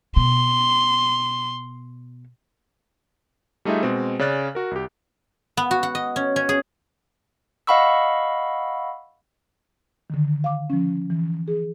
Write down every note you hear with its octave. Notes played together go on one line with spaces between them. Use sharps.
B2 C6
G3 A3 D#4 F4 G#4 E5
B2 G#3 C4
C#3 C#4 D5 F#6 A6
F#4 A#4
C2 G4
B3
F#4
F#5
D#5
C#4
C#4
G#4
D#5 F5 F#5 B5 C#6 E6
D3 D#3
F5 D6
F3 C#4
E3
G#4